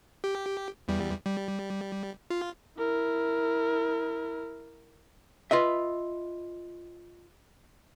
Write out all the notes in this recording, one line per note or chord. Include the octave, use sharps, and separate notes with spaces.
G4
E2 G3
G3
F4
E4 A#4
F4 B4 D#5 E5